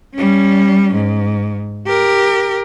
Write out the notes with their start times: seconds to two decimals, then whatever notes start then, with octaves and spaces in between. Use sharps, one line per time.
0.14 G3 C#4
0.93 G#2
1.87 G4 A#4